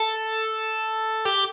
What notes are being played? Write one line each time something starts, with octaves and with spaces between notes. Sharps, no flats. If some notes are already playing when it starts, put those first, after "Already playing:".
Already playing: A4
G4